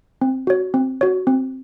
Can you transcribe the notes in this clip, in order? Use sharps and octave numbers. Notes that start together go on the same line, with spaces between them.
C4
F#4 C#5
C4
F#4 C#5
C4